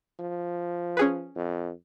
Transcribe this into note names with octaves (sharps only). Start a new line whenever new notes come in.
F3
C#4 G#4 B4
F2